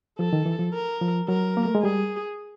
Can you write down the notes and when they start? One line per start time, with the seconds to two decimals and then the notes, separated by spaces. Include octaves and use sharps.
0.19 F3 A4
0.33 D#3
0.46 E3
0.59 F3
0.74 A#4
1.01 F3
1.28 F#3 A#4
1.57 A#3
1.65 A3
1.75 G#3
1.83 G3 G#4